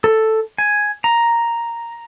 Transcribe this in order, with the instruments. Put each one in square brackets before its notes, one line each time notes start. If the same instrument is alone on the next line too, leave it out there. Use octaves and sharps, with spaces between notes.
[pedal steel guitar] A4
G#5
A#5